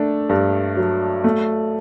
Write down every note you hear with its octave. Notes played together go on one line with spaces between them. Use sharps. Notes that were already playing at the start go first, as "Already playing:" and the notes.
Already playing: A3 D4
G2
F#3
A3